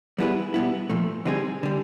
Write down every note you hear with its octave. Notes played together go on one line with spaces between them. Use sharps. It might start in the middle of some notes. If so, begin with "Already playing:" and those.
G3 B3 E4 G#4 B4
B2 G3 B3 E4
A#2 F3 A3
D3 G3 C4 D#4 G#4
D3 G3